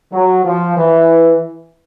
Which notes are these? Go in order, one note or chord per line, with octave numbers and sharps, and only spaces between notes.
F#3
F3
E3